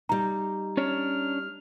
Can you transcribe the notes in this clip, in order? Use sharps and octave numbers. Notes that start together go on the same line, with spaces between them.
G3 D#4 A#5
C#4 D4 C#5 F6